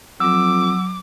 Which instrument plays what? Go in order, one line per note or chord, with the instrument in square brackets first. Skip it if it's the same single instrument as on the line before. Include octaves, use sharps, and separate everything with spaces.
[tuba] F2 [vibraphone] F#3 [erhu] D6 [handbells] E6